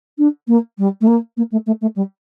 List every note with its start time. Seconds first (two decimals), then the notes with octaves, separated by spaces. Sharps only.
0.18 D4
0.47 A#3
0.78 G3
1.01 A3
1.07 A#3
1.37 A#3
1.51 A3
1.66 A3
1.81 A3
1.96 G3